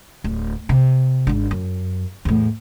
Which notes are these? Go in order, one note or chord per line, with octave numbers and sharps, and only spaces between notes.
D1
C3
G#1 D4
F#2
E2 A2